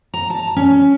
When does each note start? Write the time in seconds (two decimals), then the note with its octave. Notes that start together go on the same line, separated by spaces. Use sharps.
0.14 A#5
0.30 A5
0.57 C#4